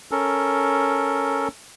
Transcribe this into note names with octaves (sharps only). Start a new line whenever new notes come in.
C#4 A4 A#4